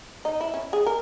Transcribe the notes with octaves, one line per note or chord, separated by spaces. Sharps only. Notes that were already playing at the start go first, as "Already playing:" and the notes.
D#4
E4
C#4
G#4
A#4